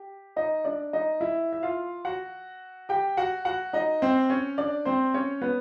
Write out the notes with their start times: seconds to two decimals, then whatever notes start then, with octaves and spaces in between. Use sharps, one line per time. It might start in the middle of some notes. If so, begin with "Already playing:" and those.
Already playing: G4
0.36 D#4 D#5
0.65 D4 D5
0.93 D#4 D#5
1.21 E4 E5
1.53 E5
1.63 F4 F5
2.05 F#4 F#5
2.89 G4 G5
3.17 F#4 F#5
3.45 F#4 F#5
3.73 D#4 D#5
4.02 C4 C5
4.30 C#4 C#5
4.58 D4 D5
4.85 C4 C5
5.14 C#4 C#5
5.42 B3 B4